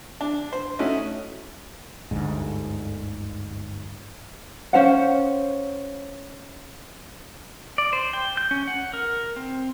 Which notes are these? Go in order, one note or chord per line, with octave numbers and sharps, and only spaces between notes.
D4
C5
A3 C#4 D#4 E4 F#4
G1 D2 G#2
C#4 C5 F5 F#5
D5
C5
G5
G6
C#4
F#5
A#4
C4